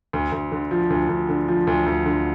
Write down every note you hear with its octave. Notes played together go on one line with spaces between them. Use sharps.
D2
D2
D3
F3
D2
D2
D3
F3
D2
D2
D3